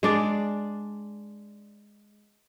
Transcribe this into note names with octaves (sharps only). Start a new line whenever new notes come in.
G#3 D4 D5